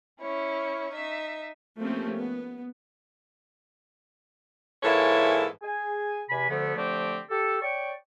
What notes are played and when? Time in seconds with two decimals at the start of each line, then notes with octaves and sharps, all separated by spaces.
0.20 C#4 E4 C#5
0.93 D#4 E5
1.79 F3 A3 A#3 C4 C#4 G4
2.18 B3
4.83 G#2 E3 A#3 E4 A4 C#5
5.62 G#4 G#5
6.30 E2 C3 G#5 B5
6.49 D2 D3 F3 A3 B3
6.76 D3 F3 A3 C4 G4
7.30 G4 A4
7.61 C#5 D5 G5 C#6